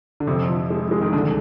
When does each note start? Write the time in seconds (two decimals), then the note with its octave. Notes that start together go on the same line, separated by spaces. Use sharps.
0.20 D3
0.27 F2 C3
0.49 F3
0.70 G#3
0.91 G#3
1.01 D#3
1.13 C2 D3